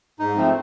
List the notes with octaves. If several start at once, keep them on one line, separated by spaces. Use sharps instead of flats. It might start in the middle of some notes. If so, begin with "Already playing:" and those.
G#2 D#4
F3 A3 C4